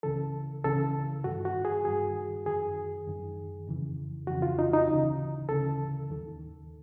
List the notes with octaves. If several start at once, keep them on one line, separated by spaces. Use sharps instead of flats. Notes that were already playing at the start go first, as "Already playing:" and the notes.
C#2 C#3 E3 A4
C#2 C#3 E3 A4
G2 D#3 F#4
F#4
G#4
G2 D#3 G#4
F#2 D#3 G#4
F#2 D#3
F2 C#3 E3
F2 C#3 E3 F#4
F4
D#4
D#4
D2 C#3 E3
D2 C#3 E3 A4
D#2 D#3